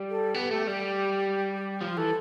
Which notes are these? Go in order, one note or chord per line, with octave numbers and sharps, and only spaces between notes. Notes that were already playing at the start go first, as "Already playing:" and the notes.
Already playing: G3
A4
B3 G4
A3 G4
G3 G4
F3 F4
E3 A4